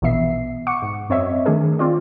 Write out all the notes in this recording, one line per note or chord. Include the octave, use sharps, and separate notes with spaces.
A#1 B2 E3 B3 E5 C7
F#5 C#6 D6 C#7
G#2
F#2 C4 C#5 D#5 E5
D#3 A3 D4 G#4 A#4
C4 F4 D5